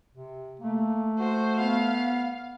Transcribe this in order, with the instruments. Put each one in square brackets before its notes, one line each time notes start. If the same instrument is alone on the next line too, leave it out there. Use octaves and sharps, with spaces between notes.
[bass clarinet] C3
[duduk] A3 [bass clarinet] A#3
[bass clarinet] F#4 [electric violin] C5
[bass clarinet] B3 [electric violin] F5